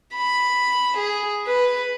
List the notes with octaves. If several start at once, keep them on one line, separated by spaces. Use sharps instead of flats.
B5
G#4
B4